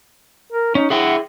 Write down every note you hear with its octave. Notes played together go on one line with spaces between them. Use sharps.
A#4
C#4 D#4
E4 G#4 E5 F#5 G5